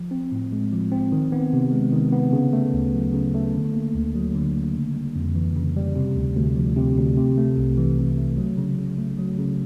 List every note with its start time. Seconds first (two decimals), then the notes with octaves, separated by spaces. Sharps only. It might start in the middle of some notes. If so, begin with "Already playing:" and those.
Already playing: F3
0.11 C4
0.32 A2
0.53 G#3
0.73 F3
0.92 C4
1.12 D#3
1.32 B3
1.53 C3
1.72 G#3
1.93 D#3
2.13 B3
2.33 C#3
2.53 A3
2.73 D2
2.94 F#3
3.13 C#3
3.35 A3
3.54 D3
3.74 A#3
3.95 D2
4.15 F#3
4.35 D3
4.55 A#3
4.75 C#3
4.95 G3
5.16 F2
5.35 E3
5.56 C#3
5.76 G3
5.95 C3
6.16 D2
6.37 D2
6.56 F3
6.76 C3
6.97 D2
7.17 C3
7.38 A3
7.57 C2
7.78 E3
7.98 C3
8.18 A3
8.37 F#3
8.58 C#3
8.79 C#3
8.98 A3
9.18 F#3
9.39 C#3